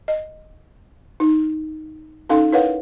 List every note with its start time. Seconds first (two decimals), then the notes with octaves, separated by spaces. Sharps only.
0.08 D#5
1.20 D#4
2.29 C#4 D#4 A4 F5 G5 C6
2.53 E4 A#4 B4 C#5 F5 F#5